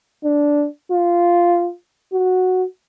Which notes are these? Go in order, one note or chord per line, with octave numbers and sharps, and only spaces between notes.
D4
F4
F#4